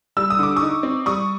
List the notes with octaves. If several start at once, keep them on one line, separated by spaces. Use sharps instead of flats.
G3 E6
D#6
D3 D6
C#6 D#6
D#4
C4
G3 C#6 D#6